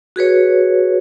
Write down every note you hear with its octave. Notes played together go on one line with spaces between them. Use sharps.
F#4 G#4 B4 C#5